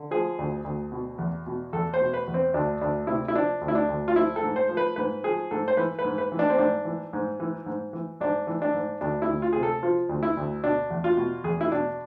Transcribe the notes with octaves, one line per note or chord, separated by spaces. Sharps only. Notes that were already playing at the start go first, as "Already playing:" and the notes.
Already playing: D3
F3 G#4
D2
D2
B2
E2
B2
E2 A4
C5
B2
B4
E2
C4
D2 D4
D2 D4
C3 E4
E4
F3 D4
D2
E4
D4
D2
F4
F3 E4
A4
G#2
C5
F3
B4
G#2 B4
F3 G#4
G#2 A4
C5
E3 B4
B4
G#2
B4
E3
D4
C4
G#2 D4
E3
G#2
E3
G#2
E3
G#2 D4
E3
D4
G#2
D2 D4
E4
D2
F4
C3 G#4
A4
F3 F4
D2
E4
D2
B2 D4
E2
F4
B2
E2 G#4
E4
B2 D4